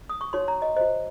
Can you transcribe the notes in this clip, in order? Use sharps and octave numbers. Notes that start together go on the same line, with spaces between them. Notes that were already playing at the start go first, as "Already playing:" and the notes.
D#6
C#6
D#4 F#4 C#5 C6
A#5
D#5
F#4 C5 D#5